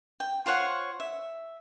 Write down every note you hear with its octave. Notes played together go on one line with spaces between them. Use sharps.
G5
F4 C5 C#5 F#5
E5